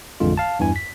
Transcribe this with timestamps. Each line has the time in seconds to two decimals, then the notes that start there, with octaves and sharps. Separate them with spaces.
0.20 A1 F2 D3 G#3 F4
0.38 F5 A5
0.59 E2 G2 E4 G#5
0.76 B6